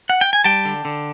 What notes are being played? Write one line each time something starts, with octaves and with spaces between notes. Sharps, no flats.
F#5
G5
G#5
G3 G5 A5
D3
D3